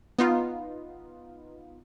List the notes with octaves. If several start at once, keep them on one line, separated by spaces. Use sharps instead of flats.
B3 D#4 F4